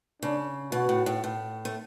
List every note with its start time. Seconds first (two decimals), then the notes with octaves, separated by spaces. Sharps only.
0.22 C#3 D4
0.72 B2 F#4
0.89 A2
1.06 A2
1.24 A2
1.65 A3